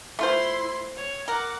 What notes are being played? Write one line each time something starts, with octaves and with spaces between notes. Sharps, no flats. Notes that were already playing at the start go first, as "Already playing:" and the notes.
A3 E4 F4 C5 C6
C#5
A#4 F#5 D6